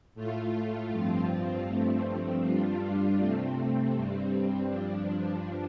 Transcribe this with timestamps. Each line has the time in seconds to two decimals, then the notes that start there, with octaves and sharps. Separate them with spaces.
0.15 A2 A3 F4
0.89 G2 F3 C4 F4
1.66 G2 F3 A3 C4
2.42 G2 G3 D4 F4
3.18 C3 A3 C4
3.94 G2 G3 C4
4.70 G2 F3 D4